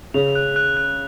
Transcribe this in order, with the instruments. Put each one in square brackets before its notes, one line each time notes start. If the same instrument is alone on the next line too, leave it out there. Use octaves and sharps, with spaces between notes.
[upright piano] C#3 [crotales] F7
[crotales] F#6
F#6
F#6